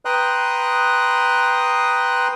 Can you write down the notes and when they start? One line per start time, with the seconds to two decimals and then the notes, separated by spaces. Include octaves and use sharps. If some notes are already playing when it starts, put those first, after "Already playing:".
0.05 B4 G5 A#5 C6 D#6 F#6